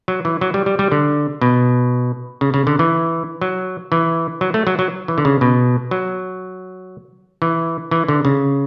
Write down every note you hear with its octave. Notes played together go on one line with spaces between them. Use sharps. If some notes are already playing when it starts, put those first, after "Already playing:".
F#3
E3
F#3
G3
G3
G3
D3
B2
C#3
C#3
D3
E3
F#3
E3
F#3
A3
F#3
F#3
E3
D3
C#3
B2
F#3
E3
E3
D3
C#3